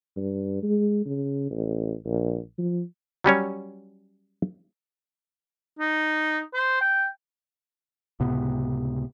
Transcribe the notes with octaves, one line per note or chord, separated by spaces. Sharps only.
G2
G#3
C#3
A1
A#1
F3
F#3 G3 C#4 C#5
D#4
C5
G5
C#2 A2 C3 B3